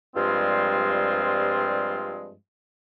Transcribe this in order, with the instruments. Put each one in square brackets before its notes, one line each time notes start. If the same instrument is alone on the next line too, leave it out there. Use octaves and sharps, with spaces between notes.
[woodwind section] G2 F3 G3 G#3 C4 F4